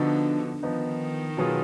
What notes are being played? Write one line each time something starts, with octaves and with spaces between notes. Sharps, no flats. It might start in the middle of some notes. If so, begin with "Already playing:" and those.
Already playing: D3 F3 B3 D#4 F#4
D#3 F3 B3 D#4
B2 F#3 B3 F4 G#4